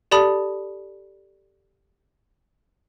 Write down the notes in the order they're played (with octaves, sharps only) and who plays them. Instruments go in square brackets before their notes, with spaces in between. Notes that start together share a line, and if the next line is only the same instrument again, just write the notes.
[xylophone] G4 A4 D5 A5 B5 D#6